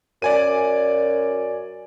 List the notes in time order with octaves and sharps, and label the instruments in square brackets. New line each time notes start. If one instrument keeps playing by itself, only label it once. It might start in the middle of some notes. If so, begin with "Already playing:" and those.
[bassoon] F#2 [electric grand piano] D5 G#5 D#7